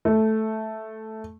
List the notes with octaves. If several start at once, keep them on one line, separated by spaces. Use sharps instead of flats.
A3